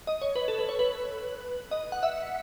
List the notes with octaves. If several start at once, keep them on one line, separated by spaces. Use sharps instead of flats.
D#5
C#5
B4
A4
B4
C#5
B4
D#5
F#5
E5